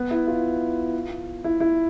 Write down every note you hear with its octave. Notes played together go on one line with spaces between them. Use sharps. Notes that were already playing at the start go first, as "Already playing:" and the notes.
Already playing: B3
E4
F4
E4
E4